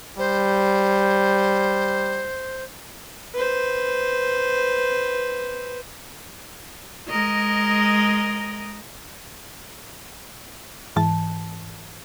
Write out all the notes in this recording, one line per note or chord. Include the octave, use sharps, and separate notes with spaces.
G3 C5
B4 C5
G#3 A#4 D#5
G#2 E3 A5